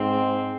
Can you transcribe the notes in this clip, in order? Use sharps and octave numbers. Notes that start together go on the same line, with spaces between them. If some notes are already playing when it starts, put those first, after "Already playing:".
Already playing: G#2 C4